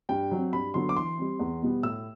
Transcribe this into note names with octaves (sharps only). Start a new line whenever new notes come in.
G2 G5
F#3 C4
G2 B5
D3 F#3 B3 C6
D6
E3 C6
G3 C4
E2
B2 G3 B3
A2 E6